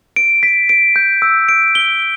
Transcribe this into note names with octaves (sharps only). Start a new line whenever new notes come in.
D7
B6
D7
G6
E6
D7
G7